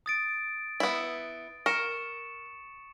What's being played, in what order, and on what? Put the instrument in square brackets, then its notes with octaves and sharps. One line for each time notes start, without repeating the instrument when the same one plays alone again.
[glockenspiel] D#6 A6 D7
[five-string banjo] B3 E4
[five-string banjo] A#4 [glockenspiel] C#6 C#7 E7